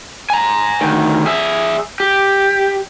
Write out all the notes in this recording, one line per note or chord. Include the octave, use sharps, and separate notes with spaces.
G#5 A#5
D2 D#3
G#4 E5
G4